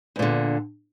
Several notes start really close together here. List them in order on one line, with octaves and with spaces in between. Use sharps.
E2 A#2 D3